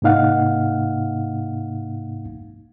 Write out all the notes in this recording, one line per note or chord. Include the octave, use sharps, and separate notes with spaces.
G#2 C3 A#3 D#4 F5 F#5